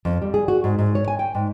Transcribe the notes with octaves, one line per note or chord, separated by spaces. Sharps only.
F2
G3
G#4
F#4
G#2
G#2
C#5
G#5
G5
G#2